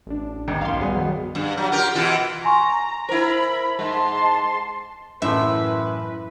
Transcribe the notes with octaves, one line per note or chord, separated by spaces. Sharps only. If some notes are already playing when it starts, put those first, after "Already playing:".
A1 D4
G#1 D#2
B1 F#2 F5 C6
G3 B3 G#4
D#3 F#3
G2
F#3
F4 G4 A#4
B2 E3 F4
G#5 A#5 C6 C#6
E4 A#4 C5 B5
G#2 G#3 A5 C6
F#2 A2 E3 E4 B4 E5 C6